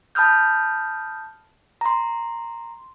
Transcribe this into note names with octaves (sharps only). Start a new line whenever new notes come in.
A5 B5 D#6 F6 G6
A#5 C6